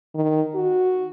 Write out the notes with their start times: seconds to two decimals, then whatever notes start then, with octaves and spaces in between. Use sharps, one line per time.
0.15 D#3
0.55 F#4